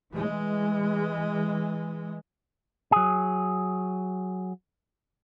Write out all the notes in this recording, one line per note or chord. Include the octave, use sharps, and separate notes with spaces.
E3 G#3
F#3 G#4